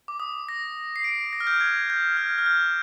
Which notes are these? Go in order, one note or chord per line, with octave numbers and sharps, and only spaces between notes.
D6
D#6
A#6
C7
D7
A#6
F6
G6
G#6
G6
F6
F6
G6